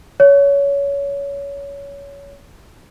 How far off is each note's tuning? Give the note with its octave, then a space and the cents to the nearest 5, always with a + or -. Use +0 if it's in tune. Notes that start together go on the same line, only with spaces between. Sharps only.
C#5 +20